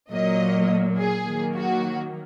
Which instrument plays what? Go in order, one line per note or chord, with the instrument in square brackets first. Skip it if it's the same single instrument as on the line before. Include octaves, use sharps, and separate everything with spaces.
[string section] A#2 F#3 A#3 D#5
G#4
D#3 F#3 A#3
F#4